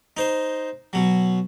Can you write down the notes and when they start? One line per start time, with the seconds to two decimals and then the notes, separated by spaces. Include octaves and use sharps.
0.17 D#4 C5
0.93 B2 F#3